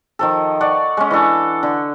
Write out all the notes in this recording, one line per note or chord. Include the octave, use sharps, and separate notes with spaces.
D#3 F3 A4
D5 F#5 C#6
G#3 C#4
E3 D4 A4
D3